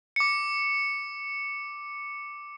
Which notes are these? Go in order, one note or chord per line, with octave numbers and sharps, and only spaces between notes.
D6 C#7